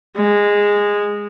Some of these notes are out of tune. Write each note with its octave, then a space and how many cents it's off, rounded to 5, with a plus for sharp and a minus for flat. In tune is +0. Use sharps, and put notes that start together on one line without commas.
G#3 -15